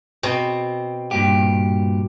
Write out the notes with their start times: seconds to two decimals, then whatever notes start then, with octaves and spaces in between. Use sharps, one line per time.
0.23 B2 C4
1.11 G2 A#2 G4